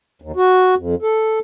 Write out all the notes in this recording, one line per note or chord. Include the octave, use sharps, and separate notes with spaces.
D#2
F#4
F2
A4